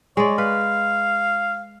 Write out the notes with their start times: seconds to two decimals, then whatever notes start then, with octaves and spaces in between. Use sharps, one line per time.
0.17 G#3 C#5 D5
0.38 B4 F5